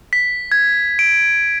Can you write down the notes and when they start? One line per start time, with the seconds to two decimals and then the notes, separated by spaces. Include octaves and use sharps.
0.13 B6
0.52 G#6
0.99 D7